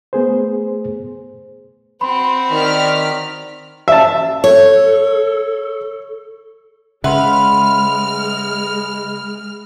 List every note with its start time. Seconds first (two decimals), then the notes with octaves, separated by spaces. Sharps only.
0.13 A3 B3 G#4 C5
2.01 C4 F#4 B5 C6
2.51 D#3 D5 F6 B6
3.88 E5 A5
4.44 A4 C#5
7.04 C#3 G#3 B4 E5 F#5 C6 F6